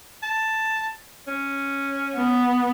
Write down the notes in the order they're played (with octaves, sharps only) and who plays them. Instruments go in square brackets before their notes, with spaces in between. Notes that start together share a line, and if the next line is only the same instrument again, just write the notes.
[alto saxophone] A5
C#4
[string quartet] B3